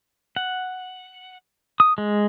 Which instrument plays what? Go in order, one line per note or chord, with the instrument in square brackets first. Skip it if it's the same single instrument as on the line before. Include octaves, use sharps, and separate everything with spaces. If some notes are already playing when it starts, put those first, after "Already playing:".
[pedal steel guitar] F#5
D#6
G#3